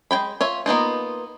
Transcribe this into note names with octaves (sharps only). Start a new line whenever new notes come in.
G#3 F4 G5 B5
F4 C#5 E5
A#3 B3 D#4 F4